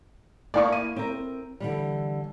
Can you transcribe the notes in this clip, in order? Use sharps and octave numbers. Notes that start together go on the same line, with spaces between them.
A#3 E4 D5 F5 C#6
D#7
C4 A#4
D3 E3 G3